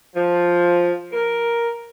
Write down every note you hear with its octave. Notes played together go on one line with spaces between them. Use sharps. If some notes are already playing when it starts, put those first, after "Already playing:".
F3
A#4